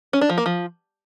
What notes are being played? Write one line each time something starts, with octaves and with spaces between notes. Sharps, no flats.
C#4
D4
F3
A#3
F3